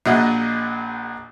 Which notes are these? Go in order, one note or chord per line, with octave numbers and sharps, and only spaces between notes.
A#1 A#2 F#4 G#4 D#5